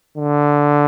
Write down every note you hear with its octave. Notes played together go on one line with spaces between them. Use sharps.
D3